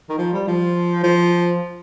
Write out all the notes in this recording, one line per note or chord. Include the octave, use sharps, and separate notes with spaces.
D#3
F3
G3
F3
F3